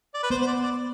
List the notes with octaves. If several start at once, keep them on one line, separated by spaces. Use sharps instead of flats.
D5
B4
B3 C5
C5
D5
D5